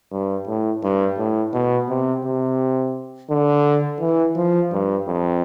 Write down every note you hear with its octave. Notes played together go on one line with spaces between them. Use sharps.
G2
A2
G2
A2
B2
C3
C3
D3
E3
F3
G2
F2